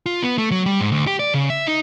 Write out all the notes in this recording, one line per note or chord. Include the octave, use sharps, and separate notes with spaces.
F4
B3
A3
F#3
G3
G#2
D2
G4
D5
C#3
E5
D#4